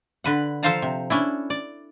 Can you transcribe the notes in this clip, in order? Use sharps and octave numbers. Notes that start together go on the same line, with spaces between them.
D3 B4 F#5
F3 A4 C5 F5 A5 A#5
C3
C#4 D4 E4
D5